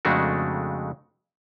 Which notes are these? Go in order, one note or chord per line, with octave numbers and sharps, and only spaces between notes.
F2 C#3 G#3 A3 D4 F#4